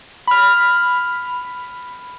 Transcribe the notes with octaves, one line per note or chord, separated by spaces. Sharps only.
B5 F6